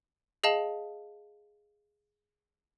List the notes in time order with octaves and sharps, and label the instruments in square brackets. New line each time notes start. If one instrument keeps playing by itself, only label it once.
[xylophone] G#4 D#5 F5 A5 F#7